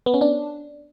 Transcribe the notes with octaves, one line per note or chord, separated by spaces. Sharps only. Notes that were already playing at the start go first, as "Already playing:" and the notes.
B3
C#4
D4